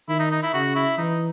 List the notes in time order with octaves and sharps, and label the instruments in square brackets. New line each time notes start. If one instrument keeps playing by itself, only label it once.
[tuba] D#3 [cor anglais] E4
[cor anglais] D#4
D#4
E4
[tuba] C#3 [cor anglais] F#4
[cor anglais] E4
[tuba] E3 [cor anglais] D#4